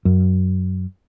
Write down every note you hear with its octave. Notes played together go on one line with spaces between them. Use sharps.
F#2